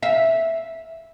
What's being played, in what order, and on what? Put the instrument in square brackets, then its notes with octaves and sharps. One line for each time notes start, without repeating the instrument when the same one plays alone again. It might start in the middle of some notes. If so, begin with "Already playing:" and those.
[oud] E5 F5